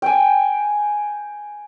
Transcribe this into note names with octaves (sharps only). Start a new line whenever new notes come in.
G5 G#5